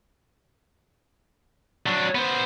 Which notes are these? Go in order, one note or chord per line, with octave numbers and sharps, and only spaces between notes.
F#3 D4
B3 C5